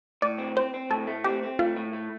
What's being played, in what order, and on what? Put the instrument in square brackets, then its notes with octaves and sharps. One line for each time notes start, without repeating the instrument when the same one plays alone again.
[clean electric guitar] A2 [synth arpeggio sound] D5
[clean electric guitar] C4
[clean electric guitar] C4 [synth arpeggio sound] C5
[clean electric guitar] C4
[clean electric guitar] A2 [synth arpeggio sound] A4
[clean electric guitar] A3
[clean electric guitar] C4 [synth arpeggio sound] G4
[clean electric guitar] C4
[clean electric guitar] A3 [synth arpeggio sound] F4
[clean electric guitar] A2
A3